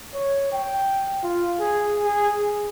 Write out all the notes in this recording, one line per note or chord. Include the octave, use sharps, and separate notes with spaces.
C#5
G5
F4
G#4
G#4